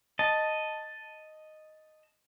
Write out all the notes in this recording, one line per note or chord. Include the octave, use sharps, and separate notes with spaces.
D#5 A5